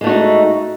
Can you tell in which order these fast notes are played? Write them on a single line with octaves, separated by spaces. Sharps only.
G#3 A3 F#4 D#4